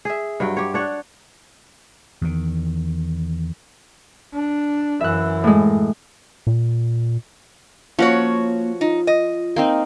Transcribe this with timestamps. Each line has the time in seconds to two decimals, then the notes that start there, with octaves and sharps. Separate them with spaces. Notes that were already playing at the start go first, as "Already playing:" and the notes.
0.05 G#4 E5
0.40 G2 F#3 G5
0.57 G4 C#5
0.74 D4 C#5 F#5
2.21 E2 D#3
4.33 D4
5.01 F#2 E3 E5 F#6
5.44 A2 G#3
6.47 A#2
7.99 F3 A#3 C#4 F#4 C#5 F#5
8.81 D#4 F4
9.07 D#5
9.56 A#3 C4 D#4